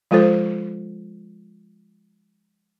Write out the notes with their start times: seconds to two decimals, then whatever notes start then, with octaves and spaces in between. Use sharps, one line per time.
0.11 F3 G#3 F4 A4 C5